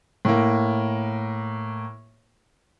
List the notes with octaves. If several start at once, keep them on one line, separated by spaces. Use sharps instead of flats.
A2 A#3